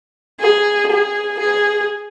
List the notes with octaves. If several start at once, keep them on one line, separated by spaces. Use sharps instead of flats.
G#4
G#4
G#4